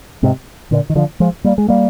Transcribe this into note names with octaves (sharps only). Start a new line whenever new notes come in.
G#2 C3
A#2 D3
D#3
D3 F3
F3 G#3
G3 A#3
G#3
G3 A#3